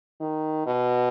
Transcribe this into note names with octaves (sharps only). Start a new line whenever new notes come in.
D#3
B2